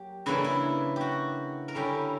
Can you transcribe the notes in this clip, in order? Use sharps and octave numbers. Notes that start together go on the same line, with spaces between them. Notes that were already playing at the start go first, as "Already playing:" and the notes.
Already playing: F#3 A#3 G4
C#3 E3 A#3 D4 E4
E4
F#4 G4
A#4
D3 G3 C#4 E4 G4